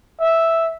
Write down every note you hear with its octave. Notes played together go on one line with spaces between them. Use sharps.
E5